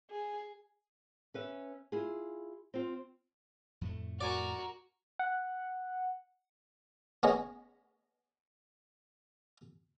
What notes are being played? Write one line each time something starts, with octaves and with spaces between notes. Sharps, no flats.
G#4
C#4 B4 E5
E4 F4 G#4
C4 F4
F2 A2 A3
F#4 A#4 D5 G#5
F#5
B3 C#4 G#4 D#5